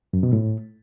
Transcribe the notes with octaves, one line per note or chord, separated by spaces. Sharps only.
F#2
B2
A2